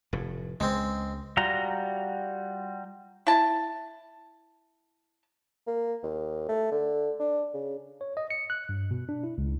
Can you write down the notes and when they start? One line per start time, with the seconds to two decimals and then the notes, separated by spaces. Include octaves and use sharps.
0.13 F1 A2
0.60 C#2 G#3 C4
1.37 G3 F4 F#4 A#5
3.27 E4 A5
5.67 A#3
6.03 D#2
6.49 A3
6.72 D3
7.19 D4
7.54 C#3
8.01 C#5
8.17 D#5
8.30 C#7
8.50 F#6
8.69 G2
8.91 B2
9.09 D4
9.24 E4
9.38 C#2